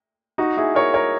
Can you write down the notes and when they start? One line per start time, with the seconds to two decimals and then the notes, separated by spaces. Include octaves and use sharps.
0.38 D#4 F#4
0.57 E4 G#4
0.75 A#4 C#5
0.94 A#4 C#5